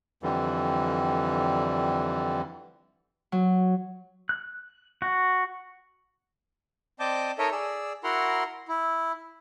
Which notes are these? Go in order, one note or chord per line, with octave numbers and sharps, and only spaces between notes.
F2 D3 E3 G3
F#3
F#6
F#4
C4 D5 D#5 A5 D6 G6
D#4 A4 A#4 C#5 D#5 E5
G#4 D5 E6
E4 F#4 A#4 F#5 A#5 C6
E4